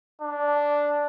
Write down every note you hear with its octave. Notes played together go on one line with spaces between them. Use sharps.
D4